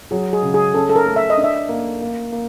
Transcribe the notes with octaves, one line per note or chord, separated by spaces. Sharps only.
F#3 G#4
G#4
C#3
G#4
C#4 A4
A4
A#4
A3
E5
D#5
D4
E5
A#3
A#3
A#3